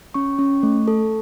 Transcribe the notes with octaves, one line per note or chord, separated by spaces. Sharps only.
C#4 C#6
C#4
A3
A4